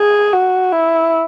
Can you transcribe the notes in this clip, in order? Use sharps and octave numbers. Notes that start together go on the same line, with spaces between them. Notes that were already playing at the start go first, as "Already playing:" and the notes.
Already playing: G#4
F#4
E4